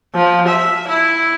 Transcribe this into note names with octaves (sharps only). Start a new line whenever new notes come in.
F3
E5
E4